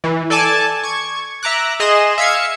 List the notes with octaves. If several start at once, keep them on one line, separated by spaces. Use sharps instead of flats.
E3
A4 D5 G#5 A5 D6
C#6 G#6
E5 A#5 D6 F#6
G#4 D#5 C6 E7
E5 F5 G#6 C#7